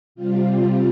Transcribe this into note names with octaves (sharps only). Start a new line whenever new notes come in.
C3 G3 C4 F4